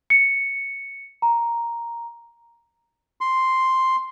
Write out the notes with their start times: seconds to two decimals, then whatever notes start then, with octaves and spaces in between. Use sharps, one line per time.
0.10 C#7
1.22 A#5
3.21 C6